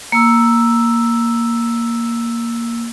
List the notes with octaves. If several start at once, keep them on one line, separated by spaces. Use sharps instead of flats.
A#3 E6